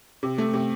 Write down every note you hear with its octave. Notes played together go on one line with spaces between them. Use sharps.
C3
A3
C3